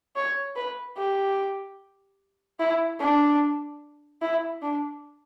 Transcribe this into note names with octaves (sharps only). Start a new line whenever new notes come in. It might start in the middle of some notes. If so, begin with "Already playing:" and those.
C#5
B4
G4
E4
D4
E4
D4